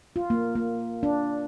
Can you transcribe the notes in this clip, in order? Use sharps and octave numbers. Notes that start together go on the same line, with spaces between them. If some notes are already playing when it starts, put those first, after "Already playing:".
F4
A#3
A#3
D4